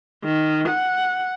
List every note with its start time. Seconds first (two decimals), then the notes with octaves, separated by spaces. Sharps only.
0.24 D#3
0.68 F#5